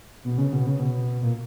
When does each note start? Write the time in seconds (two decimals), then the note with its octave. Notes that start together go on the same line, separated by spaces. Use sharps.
0.24 B2
0.38 C#3
0.53 B2
0.66 C#3
0.79 B2
1.22 A#2